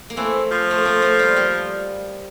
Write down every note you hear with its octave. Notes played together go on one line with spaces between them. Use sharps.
A#3
E3 A3 C4
F3
A3
A#3
A3 C4
A3 C4
G3 A#3
G3 A#3